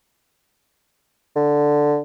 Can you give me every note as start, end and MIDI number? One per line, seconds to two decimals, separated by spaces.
1.36 2.00 50